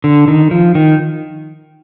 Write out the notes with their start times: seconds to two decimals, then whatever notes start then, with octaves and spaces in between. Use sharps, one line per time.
0.04 D3
0.28 D#3
0.51 F3
0.75 D#3